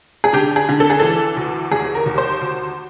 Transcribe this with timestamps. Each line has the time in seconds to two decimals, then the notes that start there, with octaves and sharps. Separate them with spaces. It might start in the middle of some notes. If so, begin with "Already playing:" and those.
0.24 G#4
0.33 D3 G4
0.56 G#4
0.69 D3
0.80 A4
0.90 G#4
1.00 E3 A4
1.37 D2
1.71 D#2 G#4
1.95 A#4
2.06 D#2
2.18 C5
2.41 D2